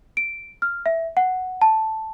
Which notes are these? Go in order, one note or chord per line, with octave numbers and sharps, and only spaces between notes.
D7
F6
E5
F#5
A5